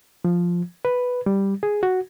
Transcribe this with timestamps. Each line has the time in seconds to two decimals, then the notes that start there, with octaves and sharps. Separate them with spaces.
0.25 F3
0.85 B4
1.26 G3
1.63 G#4
1.83 F#4